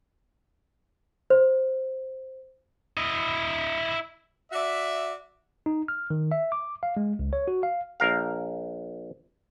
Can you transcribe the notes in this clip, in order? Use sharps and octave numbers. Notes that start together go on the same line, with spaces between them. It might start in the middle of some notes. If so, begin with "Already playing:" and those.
C5
E4 D#5
F#4 D5 E5
D#4
F6
D#3
E5
D6
F5
G#3
C#2
C#5
F#4
F5
A#1 A#4 F5